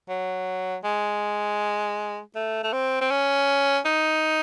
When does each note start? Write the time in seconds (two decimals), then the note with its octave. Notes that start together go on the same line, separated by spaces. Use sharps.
0.09 F#3
0.84 G#3
2.35 A3
2.64 A3
2.73 C4
3.01 C4
3.11 C#4
3.85 D#4